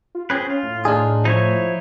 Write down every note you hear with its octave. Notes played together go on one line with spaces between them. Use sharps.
F4
C4 C#4 G#4 B4
F4
A2
D4 D#4 G#4
F3 D#4 E4 C#5